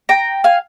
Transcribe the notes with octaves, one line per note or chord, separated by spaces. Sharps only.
G5 A#5
F5 G#5